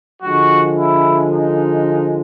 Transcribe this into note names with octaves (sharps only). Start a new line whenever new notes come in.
D3 F3 G#3 F#4
E4
D#4